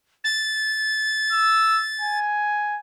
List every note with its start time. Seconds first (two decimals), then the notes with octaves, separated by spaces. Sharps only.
0.24 A6
1.32 E6
2.01 G#5